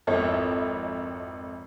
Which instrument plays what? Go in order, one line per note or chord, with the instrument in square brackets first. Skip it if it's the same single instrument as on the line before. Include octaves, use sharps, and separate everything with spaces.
[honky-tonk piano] G#1 F2 E4 A4 C#5 D#5